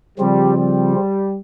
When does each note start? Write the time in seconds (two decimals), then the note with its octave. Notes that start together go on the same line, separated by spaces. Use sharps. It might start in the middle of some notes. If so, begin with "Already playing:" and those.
0.18 C#3 F3 G3 C4 F4
0.57 G3